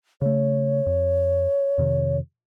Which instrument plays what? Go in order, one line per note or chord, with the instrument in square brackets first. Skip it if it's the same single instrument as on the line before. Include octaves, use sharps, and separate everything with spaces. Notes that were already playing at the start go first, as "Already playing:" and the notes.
[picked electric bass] C#3 A3 [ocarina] C#5
[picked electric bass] F2
F2 C3 D#3